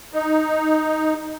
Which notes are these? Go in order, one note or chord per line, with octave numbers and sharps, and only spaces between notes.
D#4